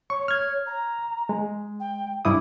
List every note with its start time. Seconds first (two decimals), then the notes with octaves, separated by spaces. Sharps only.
0.10 C#5 C#6
0.28 F6 G#6
0.66 A#5
1.29 G#3
1.80 G5
2.25 G2 E4 D6 D#6